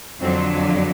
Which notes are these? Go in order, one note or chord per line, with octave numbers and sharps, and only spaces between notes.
F2 D3 F#3 C4